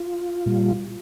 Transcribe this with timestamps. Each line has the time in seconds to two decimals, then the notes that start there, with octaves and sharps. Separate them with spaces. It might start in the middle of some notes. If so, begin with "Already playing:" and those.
Already playing: F4
0.46 A#2 G3